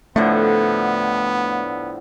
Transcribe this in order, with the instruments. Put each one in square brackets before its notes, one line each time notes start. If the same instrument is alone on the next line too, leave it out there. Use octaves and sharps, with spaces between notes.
[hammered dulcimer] A2 D3 F3 [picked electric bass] A3 [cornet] B3